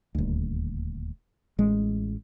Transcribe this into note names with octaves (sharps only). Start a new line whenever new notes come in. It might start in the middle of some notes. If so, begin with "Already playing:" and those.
D#1 D2
A1 G#3